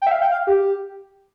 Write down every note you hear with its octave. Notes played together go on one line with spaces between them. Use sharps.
G5
E5
F5
G5
F5
G4